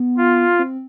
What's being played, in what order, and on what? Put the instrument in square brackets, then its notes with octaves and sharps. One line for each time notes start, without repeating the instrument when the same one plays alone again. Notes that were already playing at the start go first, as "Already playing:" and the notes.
Already playing: [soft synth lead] B3
[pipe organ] F4
[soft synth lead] C4